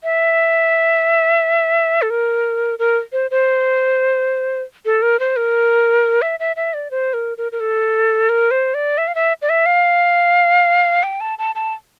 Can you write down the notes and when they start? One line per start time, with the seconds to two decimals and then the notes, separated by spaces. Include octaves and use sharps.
0.04 E5
2.02 A4
2.10 A#4
2.79 A#4
3.12 C5
3.31 C5
4.85 A4
5.02 A#4
5.20 C5
5.36 A#4
6.22 E5
6.40 E5
6.56 E5
6.74 D5
6.91 C5
7.14 A#4
7.38 A#4
7.52 A#4
7.60 A4
8.29 A#4
8.51 C5
8.74 D5
8.98 E5
9.08 F5
9.15 E5
9.42 D5
9.49 E5
9.66 F5
11.03 G5
11.21 A5
11.39 A5
11.55 A5